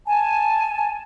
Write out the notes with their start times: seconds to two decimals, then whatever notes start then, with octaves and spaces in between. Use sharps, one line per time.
0.06 G#5 A5